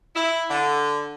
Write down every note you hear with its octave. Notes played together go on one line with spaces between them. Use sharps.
E4
D3